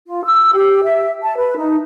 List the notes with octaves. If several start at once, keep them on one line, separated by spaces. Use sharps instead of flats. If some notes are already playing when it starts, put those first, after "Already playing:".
F4
E6
G4
E5
A5
B4
D#4